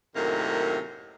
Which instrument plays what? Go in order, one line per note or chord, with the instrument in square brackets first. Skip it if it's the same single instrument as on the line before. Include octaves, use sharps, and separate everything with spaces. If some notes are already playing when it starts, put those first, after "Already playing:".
[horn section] F#2 A2 C3 D#3 A#3